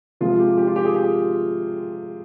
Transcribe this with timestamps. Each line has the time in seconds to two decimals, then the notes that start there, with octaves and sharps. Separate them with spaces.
0.21 C3 F3 G#3 F4
0.39 G4
0.57 G4
0.67 F4
0.76 G4
0.85 G#4
0.95 G4